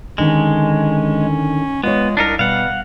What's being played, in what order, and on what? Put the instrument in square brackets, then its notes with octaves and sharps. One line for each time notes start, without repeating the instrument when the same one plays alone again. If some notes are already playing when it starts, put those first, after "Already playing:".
[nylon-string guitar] D3 D#3 [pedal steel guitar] G#3 [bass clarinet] C#4
[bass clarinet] G#3 [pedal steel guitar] B3 [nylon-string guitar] F4 C#5
[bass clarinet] C2 [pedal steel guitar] D4 D#4 A#4
[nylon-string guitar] B2 [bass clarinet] G3 [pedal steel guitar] F5 F#5